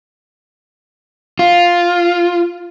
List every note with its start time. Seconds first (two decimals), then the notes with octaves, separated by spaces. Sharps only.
1.39 F4